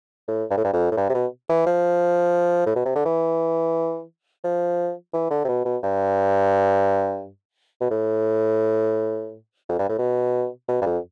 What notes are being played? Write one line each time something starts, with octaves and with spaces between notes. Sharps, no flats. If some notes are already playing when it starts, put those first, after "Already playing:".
A2
G2
A2
G2
F2
A2
G2
C3
B2
E3
F3
A2
B2
C3
D3
E3
F3
E3
D3
C3
B2
B2
G2
B2
A2
F2
G2
A2
B2
B2
G2
F2